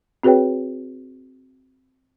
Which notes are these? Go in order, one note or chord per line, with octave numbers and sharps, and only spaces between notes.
C4 F#4 G#4 B4 C#5 G5